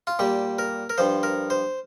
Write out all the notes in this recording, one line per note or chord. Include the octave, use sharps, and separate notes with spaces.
F4
A#2 G3 G4
A#4
A#4
G2 F3 C5
A#4
C5